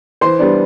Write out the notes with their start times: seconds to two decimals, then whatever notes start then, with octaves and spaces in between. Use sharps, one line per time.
0.21 E3 C5 C6
0.39 G3 B3 D4